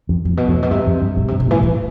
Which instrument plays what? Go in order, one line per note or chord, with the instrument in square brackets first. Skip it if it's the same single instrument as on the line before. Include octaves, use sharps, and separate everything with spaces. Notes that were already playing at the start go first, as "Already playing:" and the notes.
[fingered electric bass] F2
[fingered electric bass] F2 [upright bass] A2
[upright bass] B2
[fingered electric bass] F2 [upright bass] A2
[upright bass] B2
[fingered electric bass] G2 [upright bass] C3
[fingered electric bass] F2
G2
[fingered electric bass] G2 [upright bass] B2
[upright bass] C3
[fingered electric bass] G2
[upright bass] B2
[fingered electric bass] A2 [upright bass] E3
[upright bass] E3